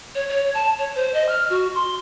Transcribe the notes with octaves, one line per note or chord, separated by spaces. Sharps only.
C#5
C#5
A5
C#5
C5
D#5
F6
F#4
C6